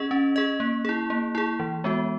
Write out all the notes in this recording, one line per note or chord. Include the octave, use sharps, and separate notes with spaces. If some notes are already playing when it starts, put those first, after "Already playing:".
Already playing: C#4 G#4 D#5
C#4
G#4 D#5
A#3
E4 G#4
A#3
E4 G#4
E3
G#3 B3 F#4